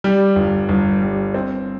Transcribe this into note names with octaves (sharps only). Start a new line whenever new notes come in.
G3
G1
G1
G3
C4